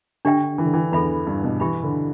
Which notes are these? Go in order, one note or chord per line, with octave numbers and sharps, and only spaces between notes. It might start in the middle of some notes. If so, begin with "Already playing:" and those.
D3 D4 G4 E5 G5
E3
D3
E3
E2 A4 E5 B5
G2
B2
E3 G4 E5 B5
D3